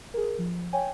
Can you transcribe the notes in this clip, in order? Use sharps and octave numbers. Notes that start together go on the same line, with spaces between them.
G#4 A#4
F3
C#5 G5 G#5